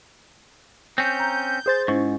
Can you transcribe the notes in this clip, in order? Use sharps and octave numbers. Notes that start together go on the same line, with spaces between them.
C4 C#4 G6
A#5
G#4 C5 A6
G#2 C#4 E4 C#6